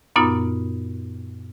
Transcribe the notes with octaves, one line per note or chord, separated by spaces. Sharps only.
F#2 A#2 B3 D#4 F4